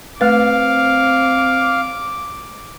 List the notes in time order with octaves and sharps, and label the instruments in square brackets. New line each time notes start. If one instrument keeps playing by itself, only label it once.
[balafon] A3 B4 [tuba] C4 [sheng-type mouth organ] F5 [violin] D6